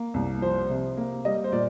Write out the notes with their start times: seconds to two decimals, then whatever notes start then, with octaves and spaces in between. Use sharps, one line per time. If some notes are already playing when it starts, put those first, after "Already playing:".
Already playing: A#3
0.14 C2
0.42 F3 C5
0.70 C3
0.97 A#3
1.25 G3 D#5
1.44 C5
1.52 A#2 D5